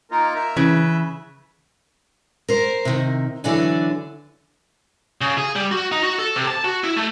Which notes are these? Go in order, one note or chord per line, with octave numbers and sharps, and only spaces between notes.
A#3 D#4 F4 A#4
E5
C#3 E3 B4
A#4 C5
C3 D#3
D3 E3 F#3 D4 D5 G#5
C#3
G#4
G3
F#4
D#4
F#4
A4
C3
A5
F#4
E4
A3